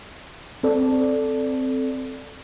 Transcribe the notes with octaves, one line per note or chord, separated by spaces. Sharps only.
C4 A4 D5